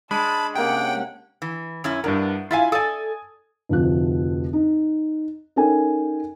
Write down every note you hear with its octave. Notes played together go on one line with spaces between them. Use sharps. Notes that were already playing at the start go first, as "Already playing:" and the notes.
G#3 D4 A5 B5
C3 A#3 C#4 F#5 G5
E3
F#2 C#4 E4
G2 B3 D4 A#4
E4 F4 E5 F5 G#5
A4 D5 G#5 D#6
F1 D2 F3 F#6
D#4
C#4 D#4 A4 A#4 G5 G#5